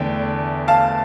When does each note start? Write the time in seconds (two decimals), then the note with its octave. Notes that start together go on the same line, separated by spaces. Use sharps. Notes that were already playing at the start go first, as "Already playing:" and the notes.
Already playing: E2 D3 A3 G5
0.68 F5 A5